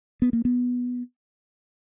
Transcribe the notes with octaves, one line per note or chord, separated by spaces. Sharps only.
B3
A#3
B3